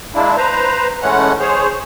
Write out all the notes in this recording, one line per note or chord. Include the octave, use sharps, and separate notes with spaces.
G#3 A#3 D4 E4
B4 C5 A#5
E3 G#3 A3 C#4 F#5
G#4 C5 C#5